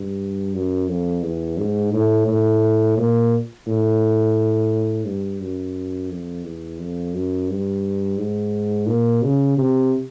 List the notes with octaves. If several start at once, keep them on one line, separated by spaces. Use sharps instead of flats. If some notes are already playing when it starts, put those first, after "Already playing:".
Already playing: G2
F#2
F2
E2
G#2
A2
A2
A#2
A2
G2
F#2
F2
E2
F2
F#2
G2
G#2
A#2
C#3
C3